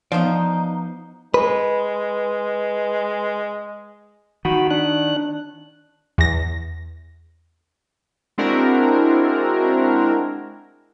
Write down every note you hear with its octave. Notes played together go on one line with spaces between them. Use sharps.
F3 B3 D#4 C5 D5 F5
G#3 B4
D#3 F#4 B5
D4 F#6
E2 A#6
G#3 C4 D4 E4 F#4 A#4